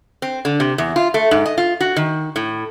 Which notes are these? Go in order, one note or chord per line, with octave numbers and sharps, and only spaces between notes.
C4
D3
C3
E2
F4
A3
G#2
D#5
F4
F#4
D#3
A2